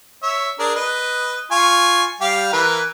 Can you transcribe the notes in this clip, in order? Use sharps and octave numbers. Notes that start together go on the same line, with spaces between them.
C#5 E5
D4 G#4 A#4
B4 D#5
F4 G#5 C#6
G3 G4 F5
E3 A#4 B4